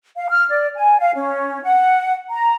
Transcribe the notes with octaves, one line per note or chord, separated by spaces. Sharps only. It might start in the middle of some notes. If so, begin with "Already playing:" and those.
F5
F6
D5
G#5
F5
C#4
F#5
A#5